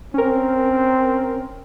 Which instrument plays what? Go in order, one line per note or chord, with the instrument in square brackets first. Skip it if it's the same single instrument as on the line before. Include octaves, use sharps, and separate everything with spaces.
[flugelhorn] C4 [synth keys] C#4 A#4